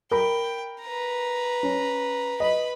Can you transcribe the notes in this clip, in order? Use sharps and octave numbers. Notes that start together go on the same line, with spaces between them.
A#4 G5 B5
B4 A#5
C#4
B4 D#5 B5